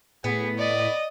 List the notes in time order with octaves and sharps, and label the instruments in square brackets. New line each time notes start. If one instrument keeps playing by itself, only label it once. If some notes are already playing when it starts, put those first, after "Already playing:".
[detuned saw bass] A2 [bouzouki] B3 [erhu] G#4
[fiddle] D5 [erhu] D#5